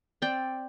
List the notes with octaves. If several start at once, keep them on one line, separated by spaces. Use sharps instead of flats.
C4 D5 G5